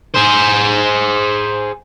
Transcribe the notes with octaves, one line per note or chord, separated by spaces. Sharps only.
G#4 C5